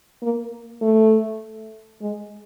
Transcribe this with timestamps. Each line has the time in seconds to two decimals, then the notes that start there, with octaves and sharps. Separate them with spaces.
0.22 A#3
0.82 A3
2.01 G#3